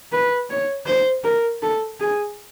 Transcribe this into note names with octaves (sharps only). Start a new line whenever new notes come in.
B4
C#5
C5
A#4
A4
G#4